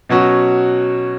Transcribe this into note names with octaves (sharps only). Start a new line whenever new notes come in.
B2 F#3 C#4 F#4